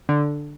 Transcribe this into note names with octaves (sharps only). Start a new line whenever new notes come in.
D3